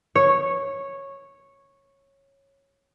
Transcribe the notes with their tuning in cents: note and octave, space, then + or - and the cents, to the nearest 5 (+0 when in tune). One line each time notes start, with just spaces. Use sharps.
C#5 -10